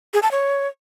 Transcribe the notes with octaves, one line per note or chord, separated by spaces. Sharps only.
G#4
A5
C#5